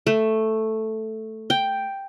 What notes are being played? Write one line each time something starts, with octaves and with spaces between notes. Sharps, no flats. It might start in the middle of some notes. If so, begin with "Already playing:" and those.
A3
G5